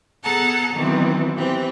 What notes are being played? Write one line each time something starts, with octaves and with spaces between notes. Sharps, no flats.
B3 G#4 A4 F#5 A5 A#5
B2 D#3 E3 F#3 C4
E3 C4 G4